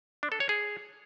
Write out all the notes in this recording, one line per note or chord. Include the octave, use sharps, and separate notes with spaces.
D4
A4
C#5
G#4